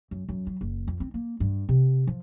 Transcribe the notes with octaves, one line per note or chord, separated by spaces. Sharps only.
F#2
F#2
F#3
F#1
F2
C4
A#3
G2
C3
F3